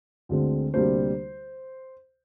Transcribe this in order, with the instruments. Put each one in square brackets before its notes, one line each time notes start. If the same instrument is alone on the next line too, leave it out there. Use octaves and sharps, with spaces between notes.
[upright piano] D2 D3 G#3 C4
D2 C3 G3 A#3 D4 C5